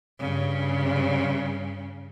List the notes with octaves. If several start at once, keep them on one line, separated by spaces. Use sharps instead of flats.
G2 C#3